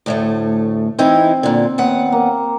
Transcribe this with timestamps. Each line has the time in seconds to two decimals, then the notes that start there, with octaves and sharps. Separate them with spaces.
0.06 D2 A2 A3
0.98 E3 C4 D#4 E4
1.43 A#2 D3
1.78 D#2 B3 F#5
2.12 A#3